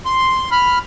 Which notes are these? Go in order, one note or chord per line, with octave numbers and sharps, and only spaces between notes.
C6
B5 F6